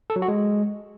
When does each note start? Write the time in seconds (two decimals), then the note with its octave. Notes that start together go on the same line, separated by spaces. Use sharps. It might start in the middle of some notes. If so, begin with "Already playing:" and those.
0.10 A4
0.16 F#3
0.22 F#4
0.28 G#3